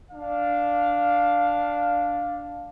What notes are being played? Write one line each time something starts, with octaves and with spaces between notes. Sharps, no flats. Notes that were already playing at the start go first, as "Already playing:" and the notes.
D4 F5